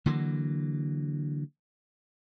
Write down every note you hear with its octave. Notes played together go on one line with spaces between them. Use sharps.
D3 E3 F#3 A#3